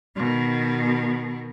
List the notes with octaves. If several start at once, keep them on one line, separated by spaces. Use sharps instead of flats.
B2 D#3